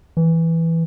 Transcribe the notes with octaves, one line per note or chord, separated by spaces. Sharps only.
E3